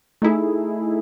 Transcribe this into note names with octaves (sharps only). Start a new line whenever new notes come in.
A3 D#4 E4 G#4